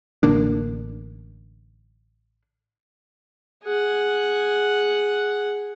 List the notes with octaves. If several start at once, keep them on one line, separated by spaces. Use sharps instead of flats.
A1 D3 A#3 D4
G#4 F#5